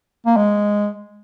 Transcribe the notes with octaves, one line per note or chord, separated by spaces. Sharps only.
A#3
G#3